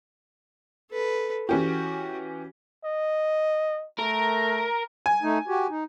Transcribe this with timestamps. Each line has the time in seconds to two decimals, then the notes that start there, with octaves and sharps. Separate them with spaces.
0.91 A4 B4
1.49 E3 C#4 F#4 G4
2.85 D#5
3.99 A3 A#4
5.06 G#5
5.22 A3 D#4
5.48 F#4 G4
5.70 D#4